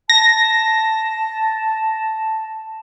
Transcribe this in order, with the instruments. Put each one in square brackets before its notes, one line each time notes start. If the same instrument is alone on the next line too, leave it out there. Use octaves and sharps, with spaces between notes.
[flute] A5 [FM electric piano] A#6